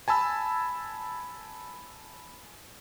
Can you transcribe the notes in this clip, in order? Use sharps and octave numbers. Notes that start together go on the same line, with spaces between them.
G#5 A5 B5 E6